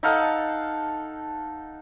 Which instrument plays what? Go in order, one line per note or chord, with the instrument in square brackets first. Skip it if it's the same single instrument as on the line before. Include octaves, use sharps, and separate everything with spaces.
[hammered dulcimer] D#4 A4 F5 F#5